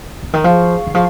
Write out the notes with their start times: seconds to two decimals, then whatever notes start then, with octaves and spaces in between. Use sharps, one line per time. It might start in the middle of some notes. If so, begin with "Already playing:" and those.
0.23 C#3
0.33 D#3
0.44 F3 G#4 F5 C#6
0.87 D#3
0.95 F3